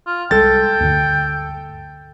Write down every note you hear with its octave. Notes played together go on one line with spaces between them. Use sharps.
F4
C2 G3 G#3 A4 G5 A6
D2 G2 D3